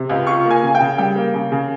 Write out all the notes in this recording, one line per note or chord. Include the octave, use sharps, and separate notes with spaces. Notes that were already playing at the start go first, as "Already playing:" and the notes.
Already playing: C3
C#2
F4 C#6
A#3
G#5
C#3 G#5
G5
C#3
G3 G5
A#3
C#3
C#3